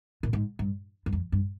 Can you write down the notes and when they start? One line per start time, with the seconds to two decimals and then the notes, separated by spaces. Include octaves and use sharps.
0.23 A#2
0.33 G#2
0.59 G2
1.06 G2
1.12 F2
1.32 G2